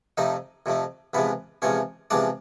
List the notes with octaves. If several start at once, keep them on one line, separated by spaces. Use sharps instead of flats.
F2 C3 F3 A3 D#4 D#5
F2 C3 F3 A3
E2 C3 F3 G#3 B3 B4
E2 C3 F3 G#3 C#4 C#5
E2 C3 F3 G#3 D4 D5